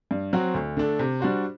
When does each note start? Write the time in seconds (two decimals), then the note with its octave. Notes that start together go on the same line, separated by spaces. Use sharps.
0.11 G2
0.33 F#3 C4 F#4
0.54 D2
0.77 D3 A3 D4 A4
0.99 C3
1.20 G3 D4 F#4 C5